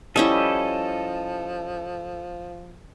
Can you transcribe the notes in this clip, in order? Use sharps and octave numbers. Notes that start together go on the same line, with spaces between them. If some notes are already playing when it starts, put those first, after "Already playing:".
F3 G3 C#4 E4 A4 D#5